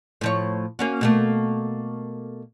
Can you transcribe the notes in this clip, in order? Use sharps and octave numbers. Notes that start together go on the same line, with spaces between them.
A2 F3 C#5
A#3 C#4 F#4
B2 A3 A#3